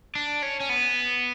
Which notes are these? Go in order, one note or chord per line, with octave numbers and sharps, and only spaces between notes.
D4
C#4
C#4
B3